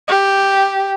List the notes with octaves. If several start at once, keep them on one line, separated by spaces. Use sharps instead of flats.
G4